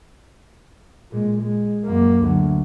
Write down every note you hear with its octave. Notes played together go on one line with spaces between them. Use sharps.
A#2 G#3
G#3
F#2 A#3
D2 F#3